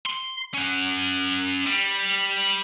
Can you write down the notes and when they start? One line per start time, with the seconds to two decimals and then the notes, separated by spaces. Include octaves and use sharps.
0.06 C6
0.54 C#4 F#4
1.67 G3